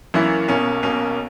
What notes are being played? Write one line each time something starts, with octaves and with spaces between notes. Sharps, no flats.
F#2 E3 A#3 C#4 E4
B1 B2 A#3 C#4
B1 B2 A#3 C#4